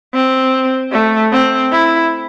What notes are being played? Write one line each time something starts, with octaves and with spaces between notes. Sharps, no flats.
C4
A3
C4
E4